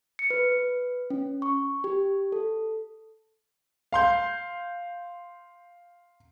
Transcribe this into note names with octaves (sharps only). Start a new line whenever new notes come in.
C#7
B4
B4
C#4
C#6
G4
A4
F5 C6 G6